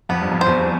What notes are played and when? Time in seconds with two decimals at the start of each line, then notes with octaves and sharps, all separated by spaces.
0.09 F2 B3
0.21 G2
0.31 F2
0.41 C5
0.46 E2